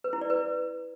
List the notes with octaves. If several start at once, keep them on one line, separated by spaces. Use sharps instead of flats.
B4
E4
D5
B4